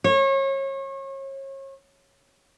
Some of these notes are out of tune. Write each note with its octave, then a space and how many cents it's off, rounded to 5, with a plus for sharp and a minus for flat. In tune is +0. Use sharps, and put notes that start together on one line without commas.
C#5 -35